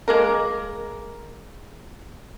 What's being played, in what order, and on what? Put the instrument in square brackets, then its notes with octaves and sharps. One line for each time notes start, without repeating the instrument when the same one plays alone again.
[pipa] G#3 A#3 A#4